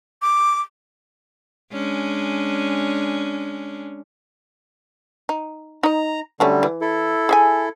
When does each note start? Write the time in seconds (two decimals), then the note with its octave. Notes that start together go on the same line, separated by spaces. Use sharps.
0.22 D6
1.73 G#3 C#4 D4
5.29 D#4
5.83 D#4 D#5 A#5
6.40 D3 F#3 G3 A3 C#4
6.63 E3
6.81 E4 A4
7.29 G#4 E5 G#5